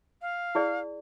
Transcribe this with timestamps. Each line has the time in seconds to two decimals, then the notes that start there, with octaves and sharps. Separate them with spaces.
0.21 F5
0.55 E4 G#4 D5